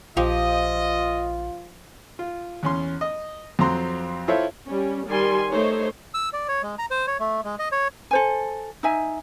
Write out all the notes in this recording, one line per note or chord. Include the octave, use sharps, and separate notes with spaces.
A#1 F3 F4 G4 D#5
F4
E2 C#4 C6
D#5
F2 F#3 C4 A#5 C6
E4 F4 A4 C5 C#5 E5
G3 C#4
D#3 G3 G#5 C6
A3 D#4 C5 C#5
E6
D5
C#5
G#3
A#5
C5
C#5
A3
G#3
D#5
C#5
A4 C5 G#5
D#4 E5 G#5